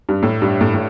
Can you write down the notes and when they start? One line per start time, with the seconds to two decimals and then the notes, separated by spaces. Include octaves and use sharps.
0.09 G2
0.23 A2
0.42 G2
0.61 A2
0.74 A2